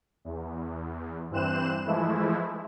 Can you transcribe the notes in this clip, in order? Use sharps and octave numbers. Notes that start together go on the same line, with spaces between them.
E2
G2 E3 C4 C5 F#6 E7
E3 F3 G#3 A3 E4